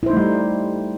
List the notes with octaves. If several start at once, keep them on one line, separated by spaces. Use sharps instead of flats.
G3 A3 D#4 E4 C5